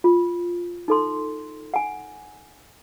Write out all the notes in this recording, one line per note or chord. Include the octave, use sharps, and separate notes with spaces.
F4
D#4 A4 C6
F#5 G#5